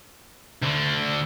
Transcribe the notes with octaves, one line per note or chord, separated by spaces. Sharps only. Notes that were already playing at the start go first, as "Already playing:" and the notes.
D2 D3